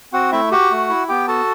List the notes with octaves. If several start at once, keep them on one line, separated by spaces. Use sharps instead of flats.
C4 F#4 F#5
A3 E4 E5
F#4 G4 F#5
A3
E4
B3 G4 G5
F#4 A4 A5